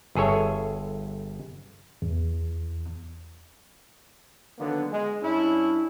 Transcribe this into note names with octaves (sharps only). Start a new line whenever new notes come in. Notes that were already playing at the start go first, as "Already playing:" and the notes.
G1 G#4 A4 C#5 E5
E2
D3 D#3 F#3 A#3 B3
G#3
G2 C#4 D4 E4